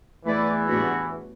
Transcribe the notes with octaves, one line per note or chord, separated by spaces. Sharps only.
E2 E3 A3 E4 B4 D5
A2 G3 B3 D4 F#4